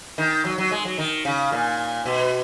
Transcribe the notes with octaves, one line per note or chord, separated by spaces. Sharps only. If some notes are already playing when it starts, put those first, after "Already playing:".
D#3
F#3
F#3
G#3
F#3
D#3
C#3
A#2
B2